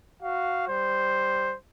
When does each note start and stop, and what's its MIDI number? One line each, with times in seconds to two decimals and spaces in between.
0.22 0.66 66
0.22 0.66 77
0.68 1.56 55
0.68 1.56 72